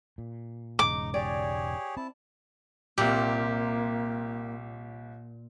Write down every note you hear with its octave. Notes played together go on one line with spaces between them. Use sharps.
A#2
E1 G#2 C#3 D#4 D6
G4 G#4 C#5 D5
C4 E4 A5
C2 A#2 A#3 G4